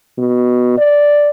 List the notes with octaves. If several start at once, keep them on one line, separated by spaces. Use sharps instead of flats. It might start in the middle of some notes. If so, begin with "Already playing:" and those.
B2
D5